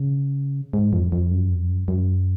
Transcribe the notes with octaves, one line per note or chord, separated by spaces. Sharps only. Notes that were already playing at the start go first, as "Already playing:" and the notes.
Already playing: C#3
G#2
F2
F2
F#2
F2
F#2
F#2